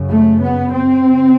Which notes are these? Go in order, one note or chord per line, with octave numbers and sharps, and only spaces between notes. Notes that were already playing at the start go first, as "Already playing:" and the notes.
Already playing: F#2 C#3
A3
B3
C4
C#3